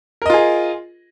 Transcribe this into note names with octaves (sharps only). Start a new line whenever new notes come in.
F4 G#4 A#4 D#5